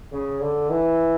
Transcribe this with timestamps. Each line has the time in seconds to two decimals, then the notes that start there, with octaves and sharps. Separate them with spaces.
0.12 C#3
0.41 D3
0.70 E3